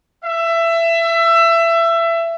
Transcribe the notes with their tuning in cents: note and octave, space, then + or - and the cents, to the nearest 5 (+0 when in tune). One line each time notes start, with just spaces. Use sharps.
E5 +20